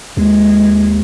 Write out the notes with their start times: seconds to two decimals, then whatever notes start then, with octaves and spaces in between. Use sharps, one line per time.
0.17 D#2 G#3